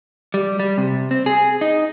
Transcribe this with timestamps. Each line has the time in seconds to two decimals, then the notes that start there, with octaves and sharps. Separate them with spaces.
0.34 G3
0.60 G3
0.78 C3
1.11 C4
1.26 G#4
1.61 D#4